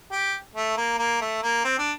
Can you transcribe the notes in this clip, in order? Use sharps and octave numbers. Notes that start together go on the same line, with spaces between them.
G4
A3
A#3
A#3
A3
A#3
C4
D4